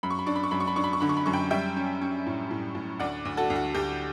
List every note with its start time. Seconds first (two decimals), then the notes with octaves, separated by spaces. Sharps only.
0.03 F#2 B5
0.10 C#6
0.19 B5
0.26 D4 C#6
0.36 B5
0.43 C#6
0.51 F#2 B5
0.60 C#6
0.67 B5
0.76 D4 C#6
0.84 B5
0.93 C#6
1.00 D3 B5
1.09 C#6
1.17 B5
1.26 F#2 C#6
1.33 G5 B5
1.51 G3 E5 G5
1.76 C#4
2.01 C#4
2.26 A2
2.51 A2
2.75 A2
3.00 D2 D5 F#5
3.25 D2
3.37 F#4 A4
3.50 D2
3.56 F#4
3.74 D2 G4